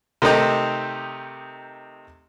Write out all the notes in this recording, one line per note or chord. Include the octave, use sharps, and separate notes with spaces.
C3 D#3 A3 D#4 G4